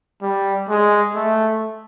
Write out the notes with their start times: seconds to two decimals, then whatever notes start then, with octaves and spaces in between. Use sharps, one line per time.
0.22 G3
0.68 G#3
1.14 A3